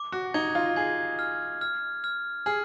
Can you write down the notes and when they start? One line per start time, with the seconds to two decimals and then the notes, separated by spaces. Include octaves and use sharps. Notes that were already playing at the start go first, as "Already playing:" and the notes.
Already playing: D6
0.12 F#4
0.34 D#4 G#6
0.55 F4
0.76 G#4 G#6
1.19 F6
1.61 F6
2.04 F6
2.46 G#4 F6